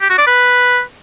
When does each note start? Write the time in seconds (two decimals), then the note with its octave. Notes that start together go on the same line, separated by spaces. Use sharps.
0.01 G4
0.09 F#4
0.18 D5
0.26 B4